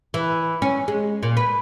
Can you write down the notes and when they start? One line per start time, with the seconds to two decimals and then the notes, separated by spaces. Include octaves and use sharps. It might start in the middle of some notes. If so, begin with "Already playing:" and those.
0.14 E3
0.62 C#4
0.88 G#3
1.23 A#2
1.37 B4